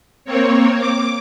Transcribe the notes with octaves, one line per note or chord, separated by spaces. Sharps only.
A#3 C4 C#5
D6